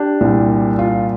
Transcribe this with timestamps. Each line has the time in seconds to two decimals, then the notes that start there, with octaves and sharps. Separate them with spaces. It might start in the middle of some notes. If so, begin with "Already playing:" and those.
Already playing: D4 G4
0.21 C2 A#2 G3
0.79 F4